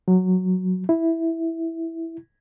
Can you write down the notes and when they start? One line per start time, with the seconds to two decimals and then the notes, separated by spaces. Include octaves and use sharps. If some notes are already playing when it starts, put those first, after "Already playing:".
0.08 F#3
0.89 E4